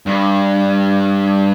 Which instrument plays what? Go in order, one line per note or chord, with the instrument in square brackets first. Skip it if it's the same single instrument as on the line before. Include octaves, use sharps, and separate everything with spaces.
[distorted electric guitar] G2